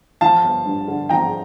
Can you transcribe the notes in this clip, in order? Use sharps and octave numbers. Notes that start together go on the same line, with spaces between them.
F3 F5 A5
G1
G2
D3
F3 G5 A#5